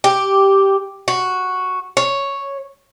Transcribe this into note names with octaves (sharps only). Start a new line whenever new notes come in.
G4
F#4
C#5